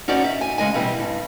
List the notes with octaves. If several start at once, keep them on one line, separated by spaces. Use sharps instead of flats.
C#4 D#4 F#4 C5 D5
E5
G#5
C#3 G#3 D#5 G#5
B2 E3 G3 C4
G2